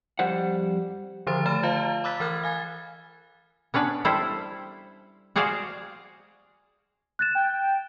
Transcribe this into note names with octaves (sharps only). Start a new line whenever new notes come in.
F2 G3 C5 F#5
D3 D#3 F3 C5 C6 A6
A3 A#5 F6 A6 E7
F4 C5 D#5 F5 A5 A#5
B5 D6 E6 F#6 A6 B6
E3 A#4 B5 F6 F#6 G#6
F5 G#5 G#6 A6
B3 C#4 D4 B4
G3 E4 A4 C5
F#4 G#4 C5 D5 F5
F#6 A6 E7
G5